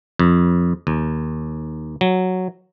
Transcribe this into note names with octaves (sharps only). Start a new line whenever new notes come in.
F2
D#2
F#3